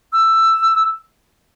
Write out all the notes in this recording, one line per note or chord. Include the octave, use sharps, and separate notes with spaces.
E6